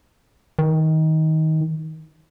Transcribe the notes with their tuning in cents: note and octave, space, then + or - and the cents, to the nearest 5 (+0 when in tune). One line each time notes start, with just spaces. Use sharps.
D#3 +20